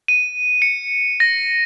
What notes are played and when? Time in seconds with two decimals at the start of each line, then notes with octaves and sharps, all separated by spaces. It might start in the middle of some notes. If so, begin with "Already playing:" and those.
0.08 D#7
0.62 C#7
1.20 A#6